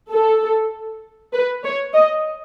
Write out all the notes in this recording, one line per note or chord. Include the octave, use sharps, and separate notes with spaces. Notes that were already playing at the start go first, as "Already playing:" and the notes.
A4
B4
C#5
D#5